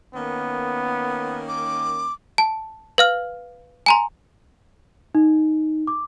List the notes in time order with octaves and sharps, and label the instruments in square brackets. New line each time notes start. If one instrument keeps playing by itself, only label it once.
[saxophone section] D#3 A#3 C#4 [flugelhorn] B3
[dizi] D6
[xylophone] A5
B4 F5 F6
G#5 A#5 C6
[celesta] D#4
D6